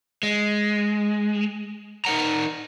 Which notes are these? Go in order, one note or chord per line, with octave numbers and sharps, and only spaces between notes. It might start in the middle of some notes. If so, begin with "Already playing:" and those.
G#3
D#4 A#4 F#5 A#5